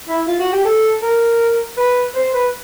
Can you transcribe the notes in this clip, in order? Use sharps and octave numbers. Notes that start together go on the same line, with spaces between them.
E4
F4
F#4
G4
A4
A#4
B4
C5
B4